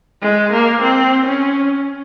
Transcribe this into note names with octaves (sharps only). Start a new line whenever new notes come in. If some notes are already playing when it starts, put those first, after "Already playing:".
G#3
A#3
C4
C#4